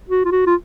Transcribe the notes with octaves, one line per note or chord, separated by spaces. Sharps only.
F#4
F4
F#4
F4